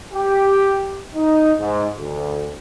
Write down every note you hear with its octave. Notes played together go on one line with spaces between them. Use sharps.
G4
D#4
G#2
D2